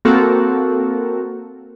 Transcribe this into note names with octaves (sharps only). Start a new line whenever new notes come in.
A#3 C4 F#4 A4 A#4